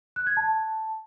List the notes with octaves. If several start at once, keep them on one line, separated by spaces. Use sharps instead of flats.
F#6
G#6
A5